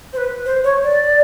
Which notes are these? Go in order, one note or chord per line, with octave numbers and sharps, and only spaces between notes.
C5
B4
C5
C#5
D5